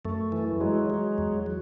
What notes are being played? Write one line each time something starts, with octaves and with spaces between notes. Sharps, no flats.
F#2 A3
E3
F#3 G#3
F#3
E2
F#3